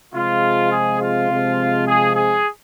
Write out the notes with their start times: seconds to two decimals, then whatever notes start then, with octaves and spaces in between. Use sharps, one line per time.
0.14 C3 F3 G#3 F4
0.72 G#4
1.00 F4
1.29 C3 F3 G#3
1.86 G#4
2.15 G#4